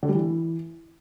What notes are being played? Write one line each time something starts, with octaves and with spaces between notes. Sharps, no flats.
D3
G3
E3